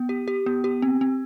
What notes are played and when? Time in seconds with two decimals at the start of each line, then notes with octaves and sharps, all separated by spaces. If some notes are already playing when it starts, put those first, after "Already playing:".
Already playing: B3
0.09 G4
0.28 G4
0.46 B3
0.64 G4
0.82 C4
1.01 C4